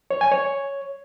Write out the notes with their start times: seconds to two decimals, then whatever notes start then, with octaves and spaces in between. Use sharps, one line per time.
0.11 C#5
0.21 G#5
0.32 C#5